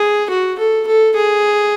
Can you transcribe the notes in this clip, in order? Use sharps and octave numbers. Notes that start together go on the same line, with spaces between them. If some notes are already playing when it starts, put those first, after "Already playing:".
Already playing: G#4
F#4
A4
A4
G#4